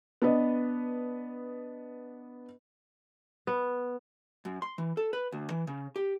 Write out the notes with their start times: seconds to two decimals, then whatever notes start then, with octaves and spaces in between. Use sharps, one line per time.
0.22 B3 D4 B4 D#5
3.47 B3
4.45 F#2
4.62 C6
4.78 E3
4.97 A4
5.13 B4
5.32 D2
5.50 E3
5.67 C#3
5.96 G4